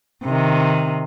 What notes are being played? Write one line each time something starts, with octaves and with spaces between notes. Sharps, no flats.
C3 D#3